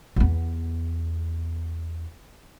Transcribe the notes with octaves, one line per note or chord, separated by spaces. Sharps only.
E2 B3